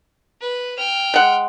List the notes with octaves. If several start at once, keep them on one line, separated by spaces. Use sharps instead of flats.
B4
G5 F6
G#3 F#5